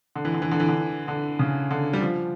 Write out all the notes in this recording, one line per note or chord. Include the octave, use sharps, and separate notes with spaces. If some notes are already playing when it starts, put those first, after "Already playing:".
D3
E3
D3
E3
D3
E3
D3
D3
C#3
D3
G3
F3